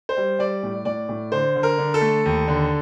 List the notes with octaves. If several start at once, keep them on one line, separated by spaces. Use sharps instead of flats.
C5
G3
G3 D5
A2
A2 D5
A2
D3 C5
D3
A#4
D3
A4
A3
D#2
D3